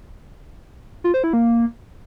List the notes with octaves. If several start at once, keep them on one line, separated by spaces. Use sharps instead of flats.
F4
C5
E4
A#3